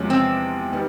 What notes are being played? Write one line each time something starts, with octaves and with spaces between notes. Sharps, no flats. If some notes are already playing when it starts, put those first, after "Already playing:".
Already playing: E2 C3 F3 G#3 C#4
C4
D#3 G3 B3